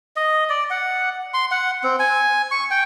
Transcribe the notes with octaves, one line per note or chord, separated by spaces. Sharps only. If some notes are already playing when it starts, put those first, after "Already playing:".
D#5
D5
F#5
C6
F#5
C4
G#5
C#6
G5